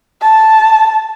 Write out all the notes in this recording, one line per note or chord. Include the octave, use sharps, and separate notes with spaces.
A5